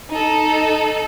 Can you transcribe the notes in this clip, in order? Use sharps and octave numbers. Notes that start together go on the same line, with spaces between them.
D#4 A4